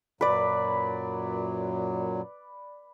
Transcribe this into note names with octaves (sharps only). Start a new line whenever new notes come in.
F#2 A#2 F#3 B4 D5